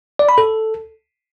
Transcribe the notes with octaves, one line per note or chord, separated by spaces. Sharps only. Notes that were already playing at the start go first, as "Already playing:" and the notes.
D5
B5
A4